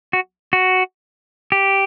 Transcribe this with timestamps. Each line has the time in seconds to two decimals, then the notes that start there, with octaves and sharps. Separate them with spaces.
0.13 F#4
0.53 F#4
1.52 G4